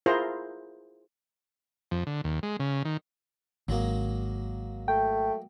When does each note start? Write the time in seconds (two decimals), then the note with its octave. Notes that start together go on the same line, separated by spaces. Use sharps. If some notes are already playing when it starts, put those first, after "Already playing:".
0.06 E4 F4 G#4 A#4 C5 A#5
1.91 F2
2.07 D3
2.24 D#2
2.43 G#3
2.60 C#3
2.85 D#3
3.68 G#1 F#3 G#3 A#3
4.88 A3 G5